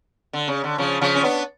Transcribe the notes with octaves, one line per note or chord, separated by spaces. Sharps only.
D3
C#3
D3
C#3 F3
C#3 F3
C#4
B3 D4